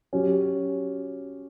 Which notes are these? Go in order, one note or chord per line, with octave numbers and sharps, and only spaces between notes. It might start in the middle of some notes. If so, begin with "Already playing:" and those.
F#3 C#4 G4